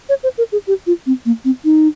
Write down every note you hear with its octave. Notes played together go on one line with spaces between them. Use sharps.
C#5
C5
A#4
G#4
G4
F4
C4
A#3
C4
D#4